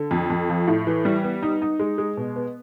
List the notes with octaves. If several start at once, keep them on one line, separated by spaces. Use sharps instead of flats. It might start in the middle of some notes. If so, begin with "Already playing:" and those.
Already playing: D3
F2
F2
F3
A2
E3
G3
B3
D#4
D#4
G#3
G#3
B2
B3